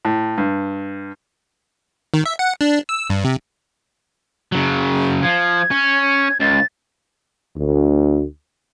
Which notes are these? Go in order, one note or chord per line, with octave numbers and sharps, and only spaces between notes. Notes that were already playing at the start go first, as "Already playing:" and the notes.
A2
G2
D#3
E5
F#5
D4
E6
G2
C3
C#3 F#3
F3 G#6
C#4
C#2 A6
D2